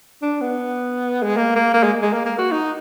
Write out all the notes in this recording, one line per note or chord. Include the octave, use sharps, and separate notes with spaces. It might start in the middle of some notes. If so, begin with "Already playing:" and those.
D4
B3
G#3
A#3
A#3
A#3
G#3
G#3
A#3
A#3
F#4
D#4